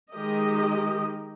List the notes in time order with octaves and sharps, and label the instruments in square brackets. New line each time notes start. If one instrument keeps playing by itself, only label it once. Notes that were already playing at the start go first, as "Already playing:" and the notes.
[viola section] D#3 G#3 G4 A#4 D#5